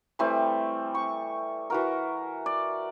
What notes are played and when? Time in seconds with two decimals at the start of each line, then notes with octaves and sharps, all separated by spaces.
0.19 E3 G3 A3 C4
0.95 C#6
1.70 E3 F#4 A#4
2.46 D5